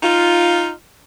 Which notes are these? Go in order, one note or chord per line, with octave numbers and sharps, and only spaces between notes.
D#4 F4